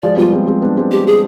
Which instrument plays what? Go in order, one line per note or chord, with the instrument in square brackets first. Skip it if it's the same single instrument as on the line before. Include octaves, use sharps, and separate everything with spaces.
[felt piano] F3 G#3 [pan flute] D5
[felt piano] G3 B3 [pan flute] F4
[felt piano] G#3 C4
G#3 C4
B3 D4
G#3 C4
[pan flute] G4
G#4